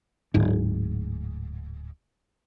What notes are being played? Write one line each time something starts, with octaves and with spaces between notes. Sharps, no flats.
D1 G#2